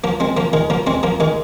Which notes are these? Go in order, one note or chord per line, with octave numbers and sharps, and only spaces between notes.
F3 A#3
G#3 C4
F3 A#3
D#3 G#3
F3 A#3
G#3 C4
F3 A#3
D#3 G#3